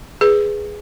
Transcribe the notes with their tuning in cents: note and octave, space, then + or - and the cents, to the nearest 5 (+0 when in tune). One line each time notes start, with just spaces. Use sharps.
G#4 +0 B4 +0